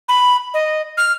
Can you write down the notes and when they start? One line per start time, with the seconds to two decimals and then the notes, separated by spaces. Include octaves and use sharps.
0.09 B5
0.54 D#5
0.97 F6